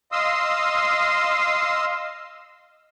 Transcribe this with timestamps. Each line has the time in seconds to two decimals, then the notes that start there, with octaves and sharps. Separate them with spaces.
0.12 D#5 F5 C6 D#6 E6